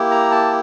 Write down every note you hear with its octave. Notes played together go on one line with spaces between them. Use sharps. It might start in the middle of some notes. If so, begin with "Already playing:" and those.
Already playing: A#3 E4 G4
A#5
A5